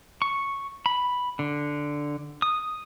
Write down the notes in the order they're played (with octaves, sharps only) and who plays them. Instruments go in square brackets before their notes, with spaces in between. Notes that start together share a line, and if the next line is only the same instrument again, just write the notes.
[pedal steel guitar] C#6
B5
D3
D#6